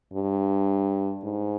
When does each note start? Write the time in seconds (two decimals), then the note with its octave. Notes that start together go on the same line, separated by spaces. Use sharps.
0.13 G2
1.24 G#2